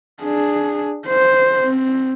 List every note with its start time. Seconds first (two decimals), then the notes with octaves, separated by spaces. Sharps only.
0.22 D4 G#4
1.07 C5
1.60 C4